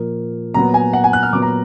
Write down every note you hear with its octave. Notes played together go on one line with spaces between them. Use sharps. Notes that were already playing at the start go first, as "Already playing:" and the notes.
Already playing: A#2 F3 A#3
A#2 F#3 B3 A#5
G#5
F#5
G#5
F#6
F6
A#2 F#3 B3 D6
A#5